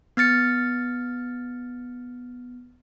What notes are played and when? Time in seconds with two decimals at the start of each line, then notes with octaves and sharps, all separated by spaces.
0.17 B3 F6 A6 C#7